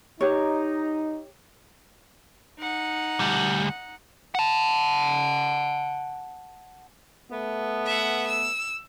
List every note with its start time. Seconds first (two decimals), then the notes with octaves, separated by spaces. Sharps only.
0.21 D#4 G4 C#5
2.59 D#4 F#5
3.20 D2 G3
4.35 F#5 A5
7.31 A3 B3
7.86 E5 F#5
8.27 E6